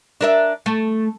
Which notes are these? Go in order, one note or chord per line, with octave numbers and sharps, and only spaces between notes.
D4 A#4 E5
A3